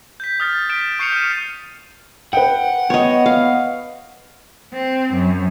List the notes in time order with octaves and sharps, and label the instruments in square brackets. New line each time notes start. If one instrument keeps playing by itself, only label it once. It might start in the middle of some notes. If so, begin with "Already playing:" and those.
[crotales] G6 B6
D#6 F6 A6
F6 A6 B6 D7 E7
C#6 G6 C7 C#7 E7 F7
F6 D#7
[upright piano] B4 G5 [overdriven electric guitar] F#5
[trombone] B3 [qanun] C#5 D#5
[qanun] F5
[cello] C4
F#2